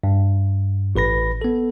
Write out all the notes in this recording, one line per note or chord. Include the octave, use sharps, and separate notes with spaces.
G2
A1 B4 B5 A#6
B3 A4